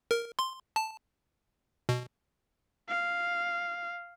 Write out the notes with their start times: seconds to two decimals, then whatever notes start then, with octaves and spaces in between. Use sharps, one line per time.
0.11 A#4
0.39 C6
0.76 A5
1.89 B2
2.89 F5